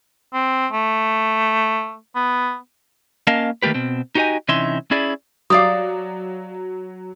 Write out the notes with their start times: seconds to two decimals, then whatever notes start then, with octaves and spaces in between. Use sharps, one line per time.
0.33 C4
0.72 A3
2.15 B3
3.27 A#3 C#4 A#4 D#5 F5 A5
3.62 D#3 A3 A#3 G4 B4
3.74 B2 C4
4.15 D#4 F#4 G4 C5 D#5 G#5
4.48 C3 E3 C#4 D#4 E5 C6
4.91 C#4 E4 G#4 D5
5.50 F#3 G4 D5 F5 D#6